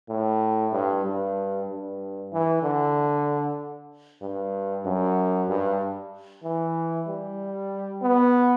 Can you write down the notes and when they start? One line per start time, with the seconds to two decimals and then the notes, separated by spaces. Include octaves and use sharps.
0.09 A2
0.73 G2
1.04 G2
1.69 G2
2.32 E3
2.63 D3
4.22 G2
4.85 F#2
5.49 G2
6.44 E3
7.08 G3
8.02 B3